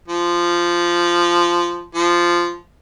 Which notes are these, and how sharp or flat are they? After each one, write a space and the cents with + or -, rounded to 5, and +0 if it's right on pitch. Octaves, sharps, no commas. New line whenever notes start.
F3 -10
F3 -10